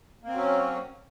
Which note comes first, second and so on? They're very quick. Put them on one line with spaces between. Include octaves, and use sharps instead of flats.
A#3 C4 F#3 C#4